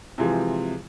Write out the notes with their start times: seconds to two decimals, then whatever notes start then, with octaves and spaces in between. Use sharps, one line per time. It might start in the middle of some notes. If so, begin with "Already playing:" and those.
0.18 C3 E3 F3 G#3